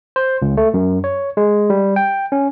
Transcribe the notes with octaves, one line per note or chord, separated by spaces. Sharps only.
C5
C#2
A3
F#2
C#5
G#3
G3
G5
C#4